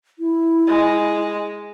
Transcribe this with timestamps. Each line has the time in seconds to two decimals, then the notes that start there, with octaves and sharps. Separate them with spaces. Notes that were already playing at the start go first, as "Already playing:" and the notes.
0.19 E4
0.67 G#3